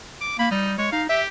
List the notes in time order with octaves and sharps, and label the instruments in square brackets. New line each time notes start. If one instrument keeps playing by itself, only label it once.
[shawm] D6
[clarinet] A#3 [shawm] B5
[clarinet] G3 [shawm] D#4
[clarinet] G#3 [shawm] C#5
[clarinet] D#4 [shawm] F5
[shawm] G4 [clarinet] E5